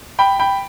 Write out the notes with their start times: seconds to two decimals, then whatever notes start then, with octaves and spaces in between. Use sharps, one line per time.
0.19 G5 B5
0.39 G5 B5